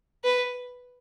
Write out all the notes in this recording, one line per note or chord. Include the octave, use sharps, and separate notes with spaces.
B4